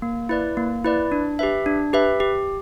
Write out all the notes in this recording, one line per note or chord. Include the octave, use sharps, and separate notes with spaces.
A#3
E4 B4 D5
A#3
E4 B4 D5
D4
G4 B4 E5
D4
G4 B4 E5
G4